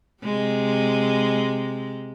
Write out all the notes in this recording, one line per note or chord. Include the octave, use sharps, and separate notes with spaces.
C3 G#3